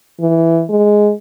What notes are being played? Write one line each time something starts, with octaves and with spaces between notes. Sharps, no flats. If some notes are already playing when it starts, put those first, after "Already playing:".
E3
G#3